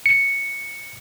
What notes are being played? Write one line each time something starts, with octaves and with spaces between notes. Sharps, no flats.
C#7